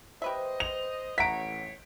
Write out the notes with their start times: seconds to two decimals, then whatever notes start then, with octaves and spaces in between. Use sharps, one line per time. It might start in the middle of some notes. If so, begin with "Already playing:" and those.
0.22 G4 B4 C5 D#5 E5
0.60 F7
1.18 A1 C#5 E5 F#5 A#5 B6 D7